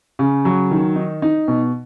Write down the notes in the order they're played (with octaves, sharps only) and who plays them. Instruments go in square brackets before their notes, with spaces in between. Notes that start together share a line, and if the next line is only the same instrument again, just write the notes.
[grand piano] C#3
F#3
D#3
D#4
D#4
B2